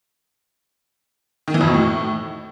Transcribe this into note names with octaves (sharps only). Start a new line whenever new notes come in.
D#3
E3
F2
B2
A2